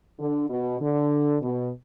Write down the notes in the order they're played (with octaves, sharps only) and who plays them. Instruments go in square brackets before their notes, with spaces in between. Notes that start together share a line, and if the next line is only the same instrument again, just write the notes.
[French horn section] D3
B2
D3
B2